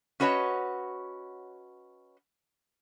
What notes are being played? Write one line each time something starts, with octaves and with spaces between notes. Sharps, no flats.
C#4 F#4 B4 C#5 D#5 A5